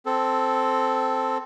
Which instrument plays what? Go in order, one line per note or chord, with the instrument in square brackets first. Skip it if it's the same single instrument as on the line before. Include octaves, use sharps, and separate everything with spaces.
[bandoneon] C4 A4